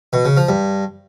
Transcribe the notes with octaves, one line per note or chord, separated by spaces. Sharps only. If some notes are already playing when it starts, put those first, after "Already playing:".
B2
C#3
F3
G2